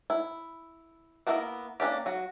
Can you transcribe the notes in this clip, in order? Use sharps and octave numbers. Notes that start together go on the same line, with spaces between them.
E4
A#3 B3 E4 A4 A#4
A#3 C#4 D4 G4
F#3 F#4